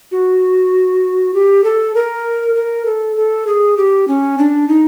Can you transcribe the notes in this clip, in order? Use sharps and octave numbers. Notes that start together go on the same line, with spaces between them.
F#4
G4
A4
A#4
A#4
A4
A4
G#4
G4
C#4
D4
D#4